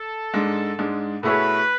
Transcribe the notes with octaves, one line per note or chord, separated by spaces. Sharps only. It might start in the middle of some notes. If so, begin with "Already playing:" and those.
Already playing: A4
G#2 G#3 D4
G#2 G#3 D4
B2 A3 E4 G#4 B4 C#5